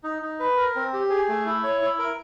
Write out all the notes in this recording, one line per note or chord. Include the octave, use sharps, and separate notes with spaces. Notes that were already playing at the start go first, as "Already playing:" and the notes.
D#4
D#4
B4
A#4
C4
G4
G#4
A3
E4
C#5
E4
A#4